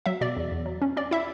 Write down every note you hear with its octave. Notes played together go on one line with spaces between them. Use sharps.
F#3 E5
B2 D5
E2
E2
F#3
C#4
C#4 D5
E4 E5